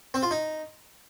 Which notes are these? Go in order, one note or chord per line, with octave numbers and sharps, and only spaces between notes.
C4
F4
D#4